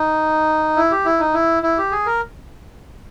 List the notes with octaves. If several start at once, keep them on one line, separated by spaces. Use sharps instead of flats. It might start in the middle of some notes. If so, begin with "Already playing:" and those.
Already playing: D#4
E4
G4
E4
D#4
E4
E4
G4
G#4
A#4